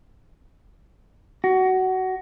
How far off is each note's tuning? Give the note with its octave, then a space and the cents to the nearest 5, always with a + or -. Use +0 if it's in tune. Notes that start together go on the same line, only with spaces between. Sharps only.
F#4 +20